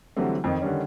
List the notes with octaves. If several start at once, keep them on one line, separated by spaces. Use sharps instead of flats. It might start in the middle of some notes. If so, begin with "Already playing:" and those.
D3 E3 F#3 G3 A3 C4
F2 D#3
D3 D#3 G3 C#4